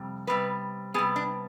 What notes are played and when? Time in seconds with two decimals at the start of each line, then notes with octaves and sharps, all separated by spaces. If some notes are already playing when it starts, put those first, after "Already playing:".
Already playing: F2 C3 G3
0.27 C3 G3 B3 B4
0.94 C3 G3 B3 G#4
1.16 D4